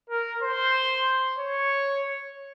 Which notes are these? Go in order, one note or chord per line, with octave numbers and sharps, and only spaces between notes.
A#4
C5
C#5